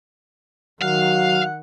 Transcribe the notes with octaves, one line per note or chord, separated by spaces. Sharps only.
D#3 F#3 F5 F#5